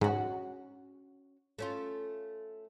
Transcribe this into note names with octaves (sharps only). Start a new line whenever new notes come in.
G#2 C#4 F#4
A3 C#4 F4